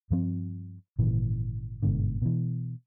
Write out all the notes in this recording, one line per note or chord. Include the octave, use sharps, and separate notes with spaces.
G2 F3 C4
G#1 A#2 C#3 E3
G1 G#2 B2 D3
B2 E3